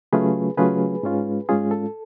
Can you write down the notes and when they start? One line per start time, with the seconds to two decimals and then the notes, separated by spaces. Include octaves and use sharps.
0.13 C#3 F#3 A3 C#4 F4 G#4 B4
0.57 C#3 F#3 A3 C#4 F4 G#4 B4
1.03 G#2 G#3 C#4 F4
1.49 G#2 G#3 C#4 F4 G#4
1.71 A4